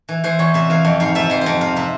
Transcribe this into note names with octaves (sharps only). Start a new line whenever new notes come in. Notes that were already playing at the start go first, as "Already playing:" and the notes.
E3
E3 C5
E2 C#5
C3 E5
E3 F5
F2
G#2 F5
F3 E5
F2 C5
C5
F2
C3 F5
C3 E5